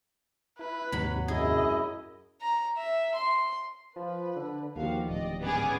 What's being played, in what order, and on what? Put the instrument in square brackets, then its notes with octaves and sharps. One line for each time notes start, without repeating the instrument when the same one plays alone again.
[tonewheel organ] E4 [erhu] B4
[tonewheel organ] D#2 G#2 C3 [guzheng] F#3 B5
[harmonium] F#2 E4 [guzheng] G#4 [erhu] D#5
[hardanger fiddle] A#5
E5
C6
[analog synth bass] F3 [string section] B4
[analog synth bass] D3
[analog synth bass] D#2 [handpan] D#3 G4 [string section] F3 F#4 F5
[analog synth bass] D1 [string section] D5 D#5
[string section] G#2 C#4 D6 [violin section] B3 G#4